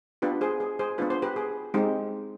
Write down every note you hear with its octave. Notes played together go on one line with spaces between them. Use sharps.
B3 D4 F4 G4 B4
G#4 C5
G#4
G#4 C5
B3 D4 F4 B4
C5
G4 B4
G#4
G#3 C4 D#4 G4